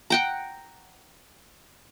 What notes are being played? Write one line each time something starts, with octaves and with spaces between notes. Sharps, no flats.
F#5 G5 A#5